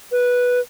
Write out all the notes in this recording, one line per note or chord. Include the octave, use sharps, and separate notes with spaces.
B4